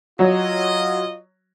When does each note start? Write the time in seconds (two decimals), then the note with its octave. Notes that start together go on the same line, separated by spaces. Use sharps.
0.19 F#3 F4 C#5 D#5